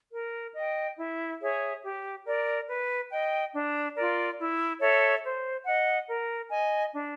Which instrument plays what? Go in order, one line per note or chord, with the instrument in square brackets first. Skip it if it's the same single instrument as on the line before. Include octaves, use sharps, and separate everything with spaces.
[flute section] A#4
D#5 G5
E4
G#4 C#5 E5
G4
A#4 D5
B4
D#5 G5
D4
F4 A#4 D5
E4
A4 C#5 E5
C5
D#5 F#5
A#4
D#5 G#5
D4